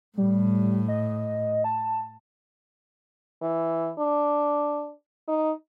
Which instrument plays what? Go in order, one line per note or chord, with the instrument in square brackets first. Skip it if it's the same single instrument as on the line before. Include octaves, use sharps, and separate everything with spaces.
[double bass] A2 [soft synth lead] G3
[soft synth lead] D#5
A5
[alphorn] E3
D4
D#4